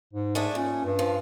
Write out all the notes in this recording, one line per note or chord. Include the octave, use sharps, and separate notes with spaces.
G#2
G#3 A3 D4
A#2 C#4
G2
F3